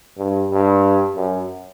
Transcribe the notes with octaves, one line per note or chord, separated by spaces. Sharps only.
G2
G2
F#2